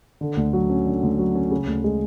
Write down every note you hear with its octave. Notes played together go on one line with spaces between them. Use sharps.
D3
D2
F#3
C#4
D3
D2
F#3
C#4
C#3
D2
G#3